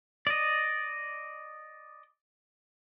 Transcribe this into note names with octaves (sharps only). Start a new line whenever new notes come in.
D5 D#5